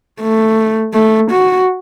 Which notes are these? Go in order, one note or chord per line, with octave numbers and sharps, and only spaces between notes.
A3
A3
F#4